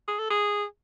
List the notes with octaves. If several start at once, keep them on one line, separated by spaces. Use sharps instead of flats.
G#4
A4
G#4